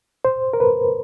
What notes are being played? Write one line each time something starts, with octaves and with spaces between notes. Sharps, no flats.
C5
A#4
B4